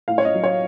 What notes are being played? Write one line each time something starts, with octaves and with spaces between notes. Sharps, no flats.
A2 F5
C#5
D#5
F#3
C#5